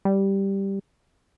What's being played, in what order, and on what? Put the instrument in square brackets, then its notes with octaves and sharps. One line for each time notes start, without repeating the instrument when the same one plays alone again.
[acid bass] G3